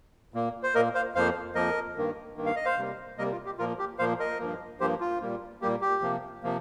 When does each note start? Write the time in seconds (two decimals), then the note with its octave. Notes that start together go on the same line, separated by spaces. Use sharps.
0.34 A#2 A#3
0.63 C5
0.74 A#2 A#3 A#4 D#5
0.95 C5 F5
1.15 F2 F3 A#3 C5 F5
1.55 F2 F3 A#3 A#4 D#5
1.97 G2 D#3 A#3
2.37 G2 D#3 A#3
2.46 F5
2.56 D#5
2.65 C5 F5
2.78 C3 G3 A#3
3.17 C3 G3 A#3 A#4 D#5
3.32 F4
3.46 G4
3.58 A#2 F3 A#3 F4 A#4
3.79 G4
3.99 A#2 F3 A#3 C5 F5
4.19 A#4 D#5
4.39 G2 F3 A#3
4.80 G2 F3 A#3 G4 C5
5.00 F4
5.21 A#2 G3 A#3
5.62 A#2 G3 A#3 G4
5.81 G4
6.02 C3 F3 A#3
6.43 C3 F3 A#3